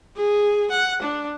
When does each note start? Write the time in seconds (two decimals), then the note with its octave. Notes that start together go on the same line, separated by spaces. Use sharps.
0.17 G#4
0.71 F#5
1.02 D4